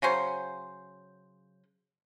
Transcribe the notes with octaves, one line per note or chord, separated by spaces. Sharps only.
C#3 F#3 C#4 C5